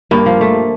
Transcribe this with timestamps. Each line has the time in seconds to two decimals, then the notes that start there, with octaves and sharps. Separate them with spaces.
0.11 G2 A#3
0.26 F3
0.41 A3